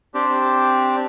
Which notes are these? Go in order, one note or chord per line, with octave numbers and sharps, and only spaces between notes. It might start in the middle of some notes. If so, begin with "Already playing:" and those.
C4 D4 G4